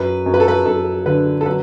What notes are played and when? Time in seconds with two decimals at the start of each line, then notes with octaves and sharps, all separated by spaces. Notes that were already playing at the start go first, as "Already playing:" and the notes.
Already playing: F#2 B4
0.26 F#2
0.34 B4
0.40 A4
0.48 B4
0.65 F#2 A4
1.06 D3 B4
1.41 A4
1.46 F#3 B4